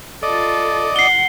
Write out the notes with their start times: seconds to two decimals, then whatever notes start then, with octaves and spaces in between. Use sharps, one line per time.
0.23 F4 A4 D5 D#5
0.96 F#5 C7 G7